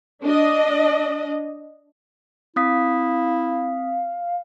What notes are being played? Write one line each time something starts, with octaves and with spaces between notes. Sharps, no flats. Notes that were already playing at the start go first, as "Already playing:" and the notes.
D4 D#5
C4 E4 F5 D#6 B6